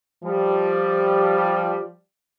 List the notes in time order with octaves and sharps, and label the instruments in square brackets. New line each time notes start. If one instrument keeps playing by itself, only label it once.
[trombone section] F3 G3